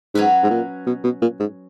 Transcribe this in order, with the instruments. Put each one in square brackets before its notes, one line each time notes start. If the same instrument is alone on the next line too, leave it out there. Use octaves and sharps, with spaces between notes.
[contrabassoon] G#2 [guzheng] F#3 C#4 F#4 B4
[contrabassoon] G#2
A#2
B2
B2
A#2
G#2